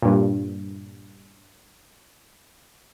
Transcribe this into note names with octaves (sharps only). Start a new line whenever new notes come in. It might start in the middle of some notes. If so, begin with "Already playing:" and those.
G2 A#2